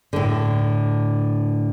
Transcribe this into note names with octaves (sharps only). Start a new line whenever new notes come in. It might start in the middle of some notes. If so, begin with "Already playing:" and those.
A2 D3